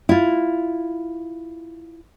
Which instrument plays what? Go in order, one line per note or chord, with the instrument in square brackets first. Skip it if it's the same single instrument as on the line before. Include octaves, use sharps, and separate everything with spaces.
[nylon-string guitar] E4 F4